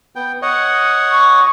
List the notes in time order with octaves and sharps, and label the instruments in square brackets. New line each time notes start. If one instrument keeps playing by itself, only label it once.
[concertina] B3 G5
C#5 D#5 F#5
[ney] C#6